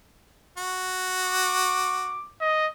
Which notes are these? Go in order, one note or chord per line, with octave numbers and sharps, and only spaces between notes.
F#4
D6
D#5